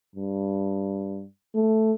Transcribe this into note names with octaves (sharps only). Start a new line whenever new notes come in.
G2
A3